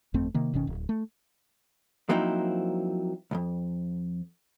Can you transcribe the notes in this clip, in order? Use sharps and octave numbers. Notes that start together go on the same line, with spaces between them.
G1 F2 A3 C4
C3 D#3 A#3
D#1 B2 D#3 C#4
D1
A3
F3 F#3 A#3 C4 D#4 E4
C2 F2